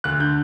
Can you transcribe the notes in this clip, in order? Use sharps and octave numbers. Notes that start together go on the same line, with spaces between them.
D2 F#6
D3 G6